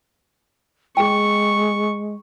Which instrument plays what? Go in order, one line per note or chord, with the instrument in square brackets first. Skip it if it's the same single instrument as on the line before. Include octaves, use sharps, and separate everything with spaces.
[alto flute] G#3 [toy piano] G#4 G5 [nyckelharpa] C#6